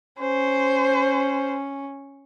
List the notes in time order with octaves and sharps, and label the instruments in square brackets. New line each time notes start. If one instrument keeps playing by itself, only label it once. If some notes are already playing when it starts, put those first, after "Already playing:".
[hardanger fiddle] C#4 [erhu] C5